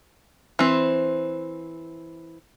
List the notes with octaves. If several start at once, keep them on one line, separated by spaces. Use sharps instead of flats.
E3 C4